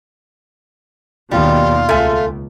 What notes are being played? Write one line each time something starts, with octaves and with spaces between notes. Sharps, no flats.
D#2 B2 D#3 G3 F4
C#2 A3 G#5